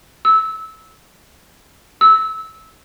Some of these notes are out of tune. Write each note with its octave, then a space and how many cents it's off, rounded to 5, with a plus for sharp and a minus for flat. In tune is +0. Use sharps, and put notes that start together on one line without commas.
E6 -20
E6 -20